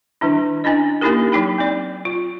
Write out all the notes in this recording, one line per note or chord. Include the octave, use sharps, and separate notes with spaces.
D#3 G3 D4 E4
C#4 D4 E4 D#5
A#3 C#4 D#4 E4 G4 A#4
F#3 D#4 G5 B5
C4 D5
F4